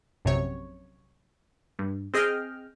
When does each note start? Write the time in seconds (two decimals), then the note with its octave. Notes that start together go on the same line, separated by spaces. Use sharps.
0.25 A#1 F#2 C3 C#5
1.79 G2
2.14 C4 G#4 D#5 G5 F6